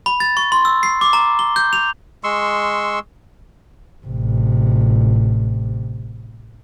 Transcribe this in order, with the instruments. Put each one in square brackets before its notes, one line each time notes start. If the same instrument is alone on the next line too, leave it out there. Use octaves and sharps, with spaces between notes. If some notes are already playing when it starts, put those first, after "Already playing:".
[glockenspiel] B5
A6
C#6
C6
E6
C7
D6
A#5
G7
G6
F7
[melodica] G#3 C6 C#6 E6
[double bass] A1 C3